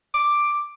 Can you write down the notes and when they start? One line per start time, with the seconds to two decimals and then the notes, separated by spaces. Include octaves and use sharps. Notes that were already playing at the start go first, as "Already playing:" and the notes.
0.15 D6